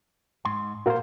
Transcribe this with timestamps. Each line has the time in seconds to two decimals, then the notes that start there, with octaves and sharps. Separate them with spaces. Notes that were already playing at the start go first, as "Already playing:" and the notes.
0.45 G#2 C6
0.86 A#2 F#4 A#4 C5 F5